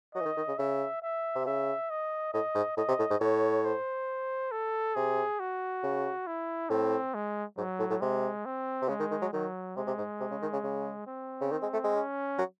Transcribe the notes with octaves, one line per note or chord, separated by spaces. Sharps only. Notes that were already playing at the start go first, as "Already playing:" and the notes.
F#3 D#5
E3
D#3
D#3
C#3
C#3 E5
E5
C3
C#3 E5
D#5
A2 D#5
G#2
A2 D#5
C3
A2
G#2
A2 C#5
C5
A4
C3 G#4
F#4
C#3
E4
A2 C4
G#3
G#2 F#3
A2
A2
C3 G#3
C4
C3
C#3 G#3
D#3
D#3
F#3
D#3 F#3
C3 G#3
C3
G#2
C3
C#3
D#3
C#3
C#3
C4
C#3
D#3
G#3
A3
G#3
C#4
F#3